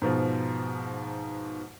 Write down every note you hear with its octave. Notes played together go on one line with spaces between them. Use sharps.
G#2 B2 F3